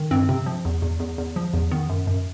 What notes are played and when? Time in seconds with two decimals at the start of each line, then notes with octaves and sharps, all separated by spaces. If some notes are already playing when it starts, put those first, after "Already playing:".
Already playing: D#3
0.11 G2 C4
0.29 C3 C4
0.46 F3
0.65 E2
0.82 E2
1.00 E2
1.18 E2
1.36 F3
1.54 E2
1.71 D#3 B3
1.90 F#2
2.07 F#2